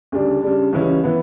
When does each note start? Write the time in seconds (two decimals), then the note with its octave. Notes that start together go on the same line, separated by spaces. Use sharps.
0.12 D2 C#3 G3 D4
0.43 C#3 G3 D4
0.73 C#2 C#3 E3 G3 C#4
1.04 E3 B3